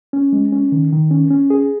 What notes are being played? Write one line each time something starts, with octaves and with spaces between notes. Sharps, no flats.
C#4
G#3
C#4
D#3
D#3
C#4
C#4
G#4